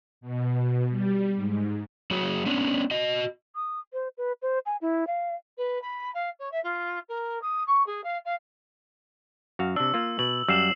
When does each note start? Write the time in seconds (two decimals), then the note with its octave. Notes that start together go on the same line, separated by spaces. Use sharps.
0.21 B2
0.89 G3
1.36 G#2
2.11 F#3 F#4 G#4 C#5
2.46 B3 C#4 D4
2.91 F#4 D#5
3.56 D#6
3.93 C5
4.18 B4
4.42 C5
4.66 G#5
4.81 E4
5.07 F5
5.58 B4
5.82 B5
6.14 F5
6.39 C#5
6.51 E5
6.64 F4
7.09 A#4
7.42 D#6
7.67 C#6
7.86 G#4
8.04 F5
8.25 F5
9.59 F#2 F#4 F5
9.76 C3 D4 E6
9.94 A#3 F4
10.19 B2 F#7
10.48 F#2 G3 F5 E6 C7 E7